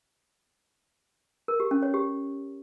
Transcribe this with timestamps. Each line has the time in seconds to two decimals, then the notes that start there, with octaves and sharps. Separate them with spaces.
1.48 A#4
1.60 G4
1.71 C#4
1.82 C#5
1.94 G4